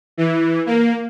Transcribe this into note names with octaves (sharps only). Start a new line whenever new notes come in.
E3
A#3